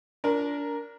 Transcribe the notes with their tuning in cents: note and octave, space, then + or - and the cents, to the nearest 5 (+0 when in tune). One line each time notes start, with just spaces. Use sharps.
D4 -25 A#4 +0